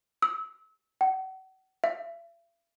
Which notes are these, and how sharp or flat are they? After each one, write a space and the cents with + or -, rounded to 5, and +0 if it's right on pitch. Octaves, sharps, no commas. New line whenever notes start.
E6 -30
F#5 +40
E5 +45